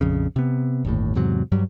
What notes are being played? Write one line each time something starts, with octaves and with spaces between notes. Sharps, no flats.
A#1 F2 C#3
C3 B3
G1 D#2 A2
E2 G#2 C3 F#3
G2 F#3 G3